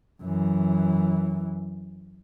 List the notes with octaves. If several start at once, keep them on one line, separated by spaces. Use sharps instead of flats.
F#2 E3